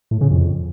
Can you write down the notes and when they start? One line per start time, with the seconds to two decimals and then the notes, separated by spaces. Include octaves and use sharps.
0.11 A2
0.21 C#3
0.31 F2